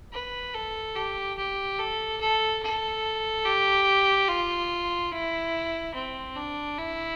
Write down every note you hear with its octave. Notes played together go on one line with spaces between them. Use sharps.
B4
A4
G4
G4
A4
A4
A4
G4
F4
E4
C4
D4
E4